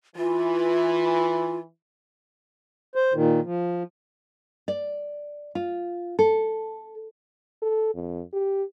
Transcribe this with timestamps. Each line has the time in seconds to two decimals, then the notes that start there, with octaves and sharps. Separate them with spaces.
0.16 E3 F4
2.95 C5
3.13 A#2 D#3
3.44 F3
4.68 D5
5.55 F4
6.19 A4
7.62 A4
7.95 F2
8.33 G4